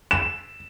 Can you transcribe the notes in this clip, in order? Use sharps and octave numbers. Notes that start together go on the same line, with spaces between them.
E7